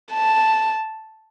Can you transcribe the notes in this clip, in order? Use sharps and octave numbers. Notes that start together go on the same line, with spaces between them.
A5